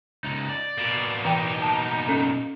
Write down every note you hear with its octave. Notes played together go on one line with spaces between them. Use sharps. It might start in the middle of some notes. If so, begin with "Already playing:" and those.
C#2 D#4
D5
B2 A#3
E3 D#4 G5
A5
C#4 A4